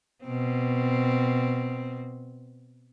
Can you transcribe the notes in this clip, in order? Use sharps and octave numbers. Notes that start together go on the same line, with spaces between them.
B2 C4